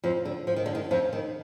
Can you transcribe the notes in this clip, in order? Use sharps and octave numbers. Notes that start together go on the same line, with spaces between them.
F2 F3
D3
F3
D#3
D3
D#3
F2 F3
D#3